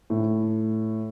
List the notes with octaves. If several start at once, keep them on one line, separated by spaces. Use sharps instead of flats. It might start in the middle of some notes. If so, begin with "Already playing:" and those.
A2